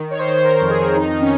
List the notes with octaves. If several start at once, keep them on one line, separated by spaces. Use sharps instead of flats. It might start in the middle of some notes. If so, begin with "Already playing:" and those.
Already playing: D#3
D#3 C#5
C5
D#3
C5
D#3 A#4
F2
G#4
F2
D#3 D#4
D#3 D#4
C#4